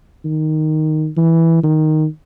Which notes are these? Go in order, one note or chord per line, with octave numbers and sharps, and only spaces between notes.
D#3
E3
D#3